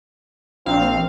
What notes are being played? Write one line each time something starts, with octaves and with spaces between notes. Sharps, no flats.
A#1 C4 F5